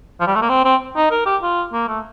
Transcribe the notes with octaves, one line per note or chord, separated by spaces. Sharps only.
F3
G3
A3
A#3
C4
C4
D#4
A#4
G4
F4
A#3
A3